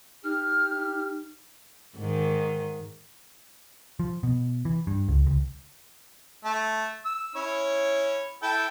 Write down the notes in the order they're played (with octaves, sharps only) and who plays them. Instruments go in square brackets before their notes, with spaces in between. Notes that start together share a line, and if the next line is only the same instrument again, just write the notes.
[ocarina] D#4 [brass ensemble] G4 [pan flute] F6
[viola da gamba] G#2 D#3
[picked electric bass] F3
B2
E3
G2
C#2
C#2
[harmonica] A3 A5
E6
C#4 E4 C#5
E4 A4 G5